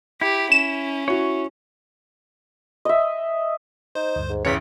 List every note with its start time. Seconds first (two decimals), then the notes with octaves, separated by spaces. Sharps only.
0.21 E4 G4
0.52 C#4 E7
1.08 E4 F#4 C#5
2.85 D#5 E5
3.95 D#4 C5
4.16 D2 G2
4.29 G#2
4.45 A1 E2 C#3 C#5 B6 C#7